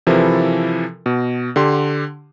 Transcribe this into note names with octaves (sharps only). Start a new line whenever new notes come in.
C3 E3 F3 E4 A4 A#4
B2
D3 G4 C6